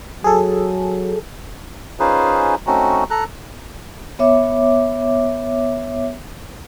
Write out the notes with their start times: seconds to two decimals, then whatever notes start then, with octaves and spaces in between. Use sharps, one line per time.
0.24 F#3 G#4 A4
2.00 C#4 D#4 F4 G#4 B4 C5
2.67 A3 C4 C#4 D#4 F#4
3.10 A4 A#5 F#6
4.19 B3 C#5 E5 D6